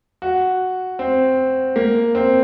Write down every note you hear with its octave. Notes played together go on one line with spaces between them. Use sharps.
F#4
C4
A#3
C4